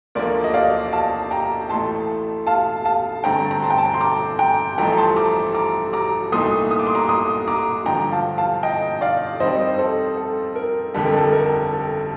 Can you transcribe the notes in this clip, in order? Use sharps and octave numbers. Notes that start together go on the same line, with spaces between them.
D2 D3 F3 A#3 A#4 D5
D#5
D5 F5
F5 A5
G5 A#5
A1 A2 A3 A5 C6
F5 A5
F5 A5
G2 D3 A3 C4 G5 A#5
A#5
A5 C6
G5
A5
A#5
C6
A#5 D6
G5 A#5
A1 G2 F3 A3 G5 A#5
A5 C6
A#5 D6
A#5 D6
A#5 D6
C2 A#2 A3 D#4 C6 D#6
D#6
D6
C6
A#5 D6
C6 D#6
A#5 D6
G2 D3 F3 G5 A#5
F5 A5
F5 A5
D#5 G5
D5 F5
F2 D#3 G3 C4 D#4 C5 D#5
A4 C5
A4
A#4
G1 F2 D3 G3 A4
A#4
A4
A#4
A4